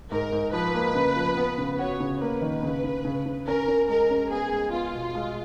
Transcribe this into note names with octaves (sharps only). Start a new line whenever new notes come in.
G#2 A#4
G#2
F3 B4
A#3
C#3
F3
B3
C#3
F#4 C#5
C#3
A#3 B4
D#3
C#3
C#3
C#3
C#3
C#4 A#4
C#4
G#3 A#4
C#4
B3 G#4
G#3
B3 F4
B2
G#3